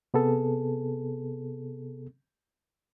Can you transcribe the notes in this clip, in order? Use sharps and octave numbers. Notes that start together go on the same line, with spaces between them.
C3 B3 G#4 A4